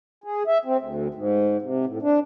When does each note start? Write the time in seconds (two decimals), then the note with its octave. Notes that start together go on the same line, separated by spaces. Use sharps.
0.24 G#4
0.47 E5
0.65 C4
0.80 D2
1.14 G#2
1.62 C3
1.86 A2
2.02 D4